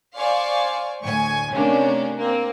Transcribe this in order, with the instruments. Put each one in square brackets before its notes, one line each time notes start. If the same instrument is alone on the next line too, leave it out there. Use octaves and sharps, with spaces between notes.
[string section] C5 D5 F5 G#5 C6 C#6
D2 A2 G#5 C#6
C3 A3 A#3 C#4 D4
A#3 C4